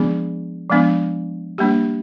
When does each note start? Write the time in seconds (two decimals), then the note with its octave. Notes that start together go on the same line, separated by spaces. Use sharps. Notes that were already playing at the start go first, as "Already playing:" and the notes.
Already playing: F3 G#3 B3 D4 G#4
0.69 F3 G#3 B3 D4
1.58 G3 A#3 D4 G4